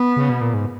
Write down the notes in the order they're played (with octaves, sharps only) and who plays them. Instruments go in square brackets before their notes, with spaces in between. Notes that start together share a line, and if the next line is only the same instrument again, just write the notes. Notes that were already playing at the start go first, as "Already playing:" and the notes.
Already playing: [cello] B3
[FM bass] C#3
B2
A#2
G#2